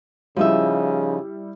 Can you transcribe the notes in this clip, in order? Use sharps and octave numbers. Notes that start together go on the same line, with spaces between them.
C#3 F3 G3 D#4 E4 E5